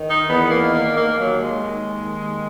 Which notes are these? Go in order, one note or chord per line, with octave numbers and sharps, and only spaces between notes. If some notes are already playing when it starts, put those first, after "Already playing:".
Already playing: D#3
D#4
E2 B3
A#3
D#3
A#3
D#2 A#3
F#3
D#3
G#3
D#2
D#3